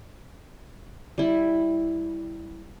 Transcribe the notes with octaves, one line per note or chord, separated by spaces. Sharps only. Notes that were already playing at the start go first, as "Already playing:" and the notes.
G3 E4